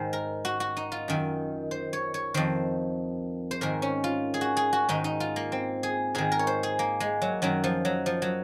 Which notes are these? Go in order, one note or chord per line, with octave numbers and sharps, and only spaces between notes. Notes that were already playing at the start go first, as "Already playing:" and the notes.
Already playing: G#2 D#3 C5
A#4
F#4
F#4
D#4
F4
F#2 D#3
C5
C#5
C#5
F2 D#3 C5
C5
G#2 D#3 A#4
C#4
F4
G#4
F#4
G#4
F#4
G#2 D#3 D#4
D#4
F4
A#3
C4
G#4
G#2 D#3 G#4
A#4
C#5
C5
G#4
A#3
G#3
F#3
F#2 D#3 F#3
F3
F#3
F3
F#3